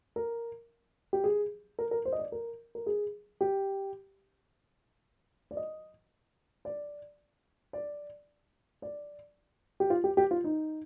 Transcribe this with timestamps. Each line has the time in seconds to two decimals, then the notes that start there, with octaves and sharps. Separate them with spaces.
0.16 A#4
1.13 G4
1.24 G#4
1.79 A#4
1.91 A#4
2.05 C5
2.12 D#5
2.19 D5
2.32 A#4
2.75 A#4
2.86 G#4
3.41 G4
5.51 D5
5.57 D#5
6.65 D5
7.73 D5
8.82 D5
9.80 G4
9.90 F4
10.04 G4
10.17 G4
10.31 F4
10.44 D#4